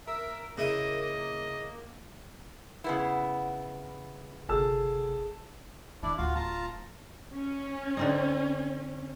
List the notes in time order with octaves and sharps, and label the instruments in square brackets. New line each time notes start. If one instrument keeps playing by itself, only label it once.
[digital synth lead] A#4 [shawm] E5
[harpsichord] C#3 E4 D#6 [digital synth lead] A#3 [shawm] D#5
[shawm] D#5
[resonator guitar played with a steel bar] C#3 B3 E4
[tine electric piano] G1 C3 A4 [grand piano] G#4 A5 E6
[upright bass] D#3 [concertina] D4 E4 D5
[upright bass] A1 D2 [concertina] F4 F#4 F5
[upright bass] D1 [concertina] F4 A5 A#5
[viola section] C#4
[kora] D3 C4 D#4